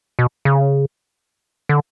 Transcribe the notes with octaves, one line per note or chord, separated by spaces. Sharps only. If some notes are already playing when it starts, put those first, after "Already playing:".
B2
C#3
D3